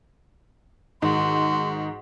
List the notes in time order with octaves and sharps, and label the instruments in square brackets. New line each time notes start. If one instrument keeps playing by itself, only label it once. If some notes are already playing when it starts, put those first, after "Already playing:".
[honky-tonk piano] G#2 [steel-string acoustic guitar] D#3 [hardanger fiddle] F#4 [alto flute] C6